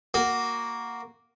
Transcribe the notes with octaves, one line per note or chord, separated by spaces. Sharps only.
A#3 F#4